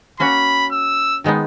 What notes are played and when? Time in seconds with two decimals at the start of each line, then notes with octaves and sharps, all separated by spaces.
0.20 A#3 C#4 F#4 C#5 B5
0.72 E6
1.24 D#3 G#3 B3 D#4